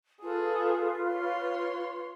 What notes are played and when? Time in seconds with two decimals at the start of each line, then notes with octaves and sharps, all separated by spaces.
0.22 F4 G#4 A4 B4
1.10 C#5 C6